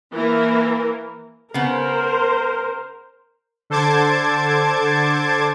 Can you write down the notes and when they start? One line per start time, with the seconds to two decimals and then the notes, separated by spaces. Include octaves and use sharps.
0.13 E3 A#3 A#4
1.54 C#3 B3 A#4 C5
3.70 D3 A4 C5 A5 D6 G#6